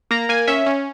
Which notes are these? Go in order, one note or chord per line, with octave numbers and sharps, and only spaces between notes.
A#3 A#5
A#3 G#5
C#4 E5
C#4